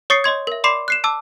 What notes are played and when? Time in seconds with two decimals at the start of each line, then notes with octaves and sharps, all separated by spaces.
0.10 C#5 C#6 D#6 A6 C7 C#7
0.24 C#5 D#5 C6 G#6
0.47 A#4 E5
0.64 D5 B5 C6 D6 C7 E7
0.88 F#6 C7 E7
1.04 A5 D6 E6